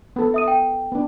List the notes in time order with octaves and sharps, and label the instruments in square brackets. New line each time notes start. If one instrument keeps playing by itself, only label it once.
[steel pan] B3 A4
[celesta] E5 D#6 D#7
G5
[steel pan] B3 D4